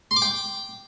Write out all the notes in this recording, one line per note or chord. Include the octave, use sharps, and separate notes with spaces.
C6
D6
G5